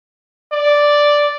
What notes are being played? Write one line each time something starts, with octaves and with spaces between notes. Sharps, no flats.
D5